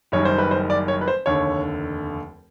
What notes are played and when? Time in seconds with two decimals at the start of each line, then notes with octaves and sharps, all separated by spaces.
0.12 F#1 F#2 D#3 G3 C#5
0.25 C5
0.38 B4
0.51 C5
0.70 D5
0.88 C#5
1.01 B4
1.08 C5
1.26 F1 D#2 D3 C#5